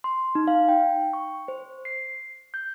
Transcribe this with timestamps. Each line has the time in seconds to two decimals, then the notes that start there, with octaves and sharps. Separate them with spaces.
0.04 C6
0.35 D#4
0.48 F5
0.69 G5
1.13 C#6
1.48 C5
1.85 C7
2.54 G6